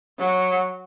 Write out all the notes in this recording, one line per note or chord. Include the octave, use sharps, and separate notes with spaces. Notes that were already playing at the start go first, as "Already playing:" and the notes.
F#3